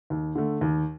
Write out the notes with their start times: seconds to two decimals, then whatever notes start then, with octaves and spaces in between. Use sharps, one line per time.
0.10 D#2
0.35 D3 A3
0.61 D#2